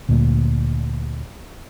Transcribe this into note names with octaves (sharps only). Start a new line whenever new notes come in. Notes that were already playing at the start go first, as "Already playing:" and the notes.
D2 A#2